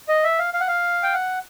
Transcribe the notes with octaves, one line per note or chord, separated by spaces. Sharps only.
D#5
E5
F5
F5
F#5
F5
G5
F#5